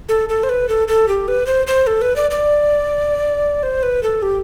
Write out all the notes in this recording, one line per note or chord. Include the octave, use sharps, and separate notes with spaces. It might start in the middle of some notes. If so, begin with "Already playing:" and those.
A4
A4
C5
B4
A4
A4
G4
B4
C5
C5
A4
B4
D5
D5
C5
B4
A4
G4